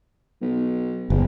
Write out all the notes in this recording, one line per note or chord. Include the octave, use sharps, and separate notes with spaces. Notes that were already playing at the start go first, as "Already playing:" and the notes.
B1
F#1 E2